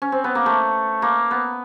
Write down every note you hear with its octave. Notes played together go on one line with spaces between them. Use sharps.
C#4
C4
B3
A#3
A3
A#3
B3